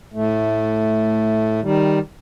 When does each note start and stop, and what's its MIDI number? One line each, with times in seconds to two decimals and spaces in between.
0.14 1.60 45
0.14 1.60 57
1.62 1.99 51
1.62 1.99 55